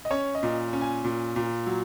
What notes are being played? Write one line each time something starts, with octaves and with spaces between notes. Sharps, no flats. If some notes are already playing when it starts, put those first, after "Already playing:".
D#5
C#4 C#5
D#5
A#2
C#4
G#5
A#2
A#2
F#3